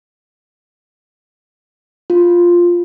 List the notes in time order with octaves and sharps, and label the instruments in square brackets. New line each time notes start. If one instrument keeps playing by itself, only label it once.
[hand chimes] F4